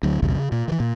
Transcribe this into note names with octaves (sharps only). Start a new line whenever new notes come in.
D2 F#3
B1 E2 G2 C#3
C#3
A#2
D#3 E3
A#2